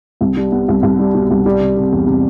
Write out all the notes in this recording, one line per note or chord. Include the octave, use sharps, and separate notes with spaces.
C2
G3
B3
C2
C2
G3
B2
C2
G3
C3
C3
E2
C3